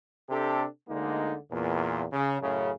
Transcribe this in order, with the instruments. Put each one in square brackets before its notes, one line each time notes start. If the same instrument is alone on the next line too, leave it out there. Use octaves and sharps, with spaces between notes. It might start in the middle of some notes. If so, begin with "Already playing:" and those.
[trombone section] C3 D4 G4 A4
D2 D3 G#3 A#3 D#4
E2 A#2
C#3
F#2 A2 C#3